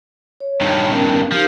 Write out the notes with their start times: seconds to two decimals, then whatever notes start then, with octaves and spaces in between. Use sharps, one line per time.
0.40 C#5
0.61 G2 D#3
0.89 B3 C#4 A#4
1.32 F3 D#4 G4 A#4